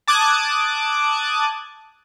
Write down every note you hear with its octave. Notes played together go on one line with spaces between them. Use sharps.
A5 D6 D#6 F#6 G#6